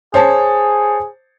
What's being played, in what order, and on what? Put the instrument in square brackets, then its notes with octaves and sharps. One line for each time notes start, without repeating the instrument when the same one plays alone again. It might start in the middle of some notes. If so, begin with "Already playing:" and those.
[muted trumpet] G#4 [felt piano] C5 C#5 A5